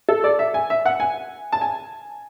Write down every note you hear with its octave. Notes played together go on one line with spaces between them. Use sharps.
A4
D5
E5
G#5
E5
F#5
G#5
A5
G#5